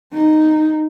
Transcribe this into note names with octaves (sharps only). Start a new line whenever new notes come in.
D#4